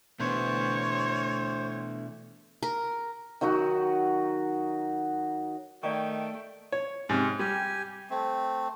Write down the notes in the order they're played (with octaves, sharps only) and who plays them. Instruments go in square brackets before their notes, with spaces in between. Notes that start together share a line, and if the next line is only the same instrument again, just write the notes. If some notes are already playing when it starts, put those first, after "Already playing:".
[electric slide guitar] B2 E3 B3 [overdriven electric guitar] A3 D4 [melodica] C5 [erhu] C#5
[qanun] A#4
[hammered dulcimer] D#3 F#3 D#4 F#4
[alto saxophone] D#3 [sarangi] A3 [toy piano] D5 F5 C#6 [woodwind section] G5
[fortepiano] C#5
[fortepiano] G#2 C3 [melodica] C#4
[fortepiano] G3 [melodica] G4 G#5
[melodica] A3 C4